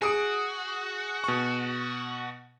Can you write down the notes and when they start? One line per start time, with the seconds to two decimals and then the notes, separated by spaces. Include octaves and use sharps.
0.02 F#4 G#4 D#6 D7
1.24 B2 C#6